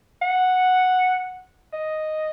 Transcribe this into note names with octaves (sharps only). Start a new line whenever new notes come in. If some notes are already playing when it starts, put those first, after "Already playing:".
F#5
D#5